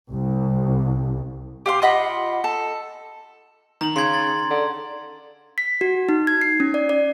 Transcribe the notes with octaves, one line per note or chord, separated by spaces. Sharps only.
C2
G4 F5 C6
F4 D#5 F#5 B5
A4
D#3 A#5 F#7
C#3 C6 G#6
A6
D3
B6
F#4
D#4
G#6
C7
C#4
D5
D5